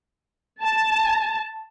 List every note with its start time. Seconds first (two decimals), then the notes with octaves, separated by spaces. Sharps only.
0.63 A5